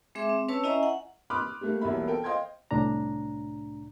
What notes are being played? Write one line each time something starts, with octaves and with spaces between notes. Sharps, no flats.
G#3 C4 G#4 E5 D6
C4
C#4 B4 C#5 A5 E6
C#4 E4 D#5 E5 G#5 A#5
F#5
B5 C6 D6 D#6 F6 F#6
G3 A3 A#3
E1 B1 G3 A#3 E4 B5
B3 A4 A#4 G5
C5 D#5 F5 G5 C6 G#6
C2 A2 D4 A#5